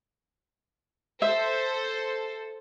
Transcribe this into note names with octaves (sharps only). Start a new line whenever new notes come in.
A4 C5 E5